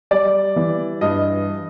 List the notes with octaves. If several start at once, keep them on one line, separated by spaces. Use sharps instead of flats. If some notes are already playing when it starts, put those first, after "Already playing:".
G3 D5
E3
G2 D#5